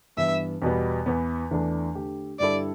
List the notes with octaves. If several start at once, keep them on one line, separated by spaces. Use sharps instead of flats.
G2 E3 B3 E5
E2 B2 G3 B3
E2 E3 B3
E2 E3 A3 D4
D3 A3 G4
G2 D3 G3 E4 A4 D5